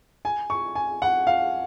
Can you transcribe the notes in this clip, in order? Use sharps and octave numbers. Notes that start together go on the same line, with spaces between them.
G#5
C#6
G#5
F#5
F5